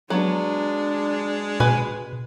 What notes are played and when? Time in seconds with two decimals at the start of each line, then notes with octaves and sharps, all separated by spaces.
0.10 F#3 G#3 B3 D4
1.60 B2 B4 G#5